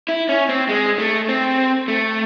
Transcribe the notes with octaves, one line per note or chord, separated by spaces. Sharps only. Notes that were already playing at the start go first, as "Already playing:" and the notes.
E4
C#4
C4
G#3
A3
C4
A3